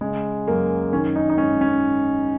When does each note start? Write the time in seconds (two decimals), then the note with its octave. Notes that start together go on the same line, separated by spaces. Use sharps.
0.01 C#3 G#3
0.48 F#2 A#3
0.92 D#3 C#4
1.16 D#4
1.30 D#4
1.38 G#2 C#4
1.61 C#4